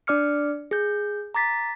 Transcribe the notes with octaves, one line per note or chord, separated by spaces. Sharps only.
D4 D5 D6 F6 C#7
G#4 G6
A#5 D6 A6 B6